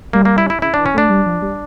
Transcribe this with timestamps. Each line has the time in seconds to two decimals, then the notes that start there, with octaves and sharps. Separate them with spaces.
0.13 G3 A#3
0.25 A#3
0.38 E4
0.50 E4
0.62 C#3 E4
0.74 E3 D4
0.86 C#4
0.94 A3 D4
1.09 G3
1.26 F3
1.42 G3